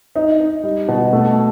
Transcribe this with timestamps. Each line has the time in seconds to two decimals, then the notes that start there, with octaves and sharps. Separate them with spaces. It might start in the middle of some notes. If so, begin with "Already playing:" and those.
0.16 D#4
0.40 D#4
0.63 G3
0.88 B2
1.13 A3